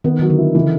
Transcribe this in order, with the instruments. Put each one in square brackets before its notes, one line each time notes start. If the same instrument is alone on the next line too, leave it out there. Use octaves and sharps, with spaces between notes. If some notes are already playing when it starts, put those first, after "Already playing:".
[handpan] D#3 [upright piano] B3
[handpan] D#3 [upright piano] F#3
[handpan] D3
[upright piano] E4
[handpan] C#3 [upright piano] E3